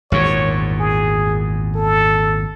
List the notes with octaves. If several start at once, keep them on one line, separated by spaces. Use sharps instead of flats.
G#1 E2 A#2 C#5
G#4
A4